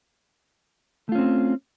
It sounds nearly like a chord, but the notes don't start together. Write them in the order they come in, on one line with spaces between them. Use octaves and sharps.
A3 F4 C#4 C4